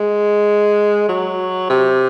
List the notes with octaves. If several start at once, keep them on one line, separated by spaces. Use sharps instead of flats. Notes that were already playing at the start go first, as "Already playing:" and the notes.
Already playing: G#3
F#3
C3